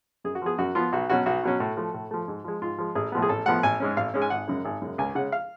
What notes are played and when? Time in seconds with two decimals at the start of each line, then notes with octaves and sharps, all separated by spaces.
0.24 F#2 G#4
0.35 F#4
0.42 F3 B3 G#4
0.58 F#2 F#4
0.75 F3 B3 F4
0.93 B1 F#4
1.10 B2 F#3 C#4 F#4
1.26 B1 F#4
1.44 B2 F#3 C#4
1.60 A2
1.77 F3 A3
1.94 A2
2.11 F3 A3
2.28 G#2
2.44 F3 G#3
2.62 G#2 F4
2.78 F3 G#3
2.95 A1 G#4
3.12 A2 F3 B3
3.22 G#4
3.29 A1 A4
3.46 A2 F3 B3 F#5
3.63 A1 G#5
3.80 G#2 G#3 C#4
3.97 A1 F5
4.14 G#2 G#3 C#4
4.22 G#5
4.30 G#1 F#5
4.48 F#2 C#3 G#3
4.65 G#1
4.82 F#2 C#3 G#3
4.98 C#2 G#5
5.15 C#3 G#3 C#4 F#5
5.32 F5